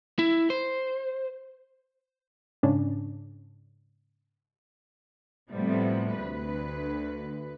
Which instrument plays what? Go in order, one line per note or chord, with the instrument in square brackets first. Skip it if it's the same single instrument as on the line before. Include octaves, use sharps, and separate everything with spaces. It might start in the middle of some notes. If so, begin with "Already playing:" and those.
[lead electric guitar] E4
C5
[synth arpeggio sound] G#2 C#3 C#4 D4
[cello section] A2 C3 F3 G3 A3 B3
D2 B4